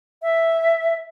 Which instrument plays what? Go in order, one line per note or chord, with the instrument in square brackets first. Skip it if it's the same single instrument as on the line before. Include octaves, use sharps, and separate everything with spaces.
[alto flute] E5